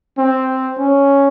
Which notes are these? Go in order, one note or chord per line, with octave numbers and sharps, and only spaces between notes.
C4
C#4